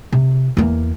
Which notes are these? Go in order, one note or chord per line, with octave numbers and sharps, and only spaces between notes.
C3
E2 A#3